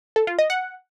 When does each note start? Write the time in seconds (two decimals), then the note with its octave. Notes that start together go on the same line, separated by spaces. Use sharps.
0.16 A4
0.27 F4
0.39 D#5
0.50 F#5